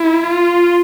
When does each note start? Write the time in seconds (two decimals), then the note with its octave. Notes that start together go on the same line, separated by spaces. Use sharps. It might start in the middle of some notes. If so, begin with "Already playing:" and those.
Already playing: E4
0.24 F4